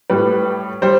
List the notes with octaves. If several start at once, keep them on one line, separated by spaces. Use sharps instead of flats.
A2 G3 B4
G3 C5